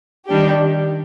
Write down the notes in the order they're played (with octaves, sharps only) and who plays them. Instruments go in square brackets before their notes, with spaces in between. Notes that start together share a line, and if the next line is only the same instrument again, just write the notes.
[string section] D#3 G3 D4 G4